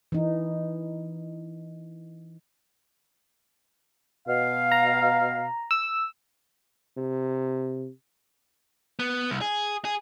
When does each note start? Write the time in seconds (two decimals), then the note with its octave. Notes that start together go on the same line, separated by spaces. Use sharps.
0.12 E3 D#4
4.28 B2 F5
4.72 A#5
5.71 E6
6.97 C3
8.99 B3
9.30 C2
9.41 G#4
9.85 G#4